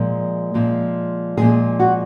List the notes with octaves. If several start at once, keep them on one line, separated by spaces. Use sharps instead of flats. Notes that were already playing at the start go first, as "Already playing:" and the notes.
Already playing: A#2 F3 G#3
A#2 F3 G#3
A#2 F3 G#3 G#4
F#4